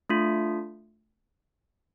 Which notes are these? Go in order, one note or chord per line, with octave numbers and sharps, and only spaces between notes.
A3 D4 F4